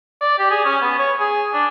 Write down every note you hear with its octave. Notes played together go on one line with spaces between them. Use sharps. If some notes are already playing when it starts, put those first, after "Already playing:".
D5
G4
G#4
C#4
B3
C#5
G#4
D4